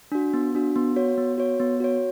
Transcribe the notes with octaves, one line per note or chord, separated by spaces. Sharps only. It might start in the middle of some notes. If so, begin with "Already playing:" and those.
D4 F#4
B3
D4 F#4
B3
F#4 C#5
B3
F#4 C#5
B3
F#4 C#5